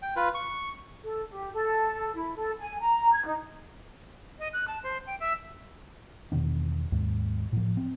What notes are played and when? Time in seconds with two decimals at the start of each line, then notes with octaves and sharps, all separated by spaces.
0.02 G5
0.16 F4 B4
0.34 C#6
1.03 A4
1.30 G4
1.53 A4
2.14 E4
2.35 A4
2.58 G#5
2.79 A#5
3.12 G#6
3.25 D#4
4.39 D#5
4.53 F#6
4.68 A5
4.83 C5
5.07 G5
5.20 E5
6.32 E2 B2 D#3 D4
6.92 D#2 G#2
7.53 A2 F3
7.77 C4